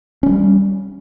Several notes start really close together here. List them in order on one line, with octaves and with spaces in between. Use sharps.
C#4 F#3 G3